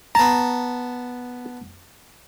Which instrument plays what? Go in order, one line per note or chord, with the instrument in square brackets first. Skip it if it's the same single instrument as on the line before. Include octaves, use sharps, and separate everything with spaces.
[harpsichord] B3 A5 [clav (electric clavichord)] A#5